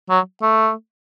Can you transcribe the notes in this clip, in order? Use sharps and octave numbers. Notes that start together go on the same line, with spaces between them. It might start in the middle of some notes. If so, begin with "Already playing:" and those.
F#3
A3